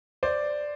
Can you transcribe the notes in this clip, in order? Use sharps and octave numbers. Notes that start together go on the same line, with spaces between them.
C5 D5